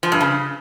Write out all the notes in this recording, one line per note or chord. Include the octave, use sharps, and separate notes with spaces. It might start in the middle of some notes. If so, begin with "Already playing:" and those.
F3
G2
C#3